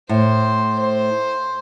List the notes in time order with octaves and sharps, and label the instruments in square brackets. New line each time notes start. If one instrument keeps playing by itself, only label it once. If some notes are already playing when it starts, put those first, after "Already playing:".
[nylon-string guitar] A2 [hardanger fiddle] C5
[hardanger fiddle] C5